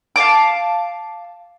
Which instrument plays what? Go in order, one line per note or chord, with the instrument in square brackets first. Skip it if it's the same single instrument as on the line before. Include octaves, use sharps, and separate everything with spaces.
[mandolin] F5 G5 A5 D6